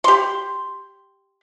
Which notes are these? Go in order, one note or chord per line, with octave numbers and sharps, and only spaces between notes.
G4 C6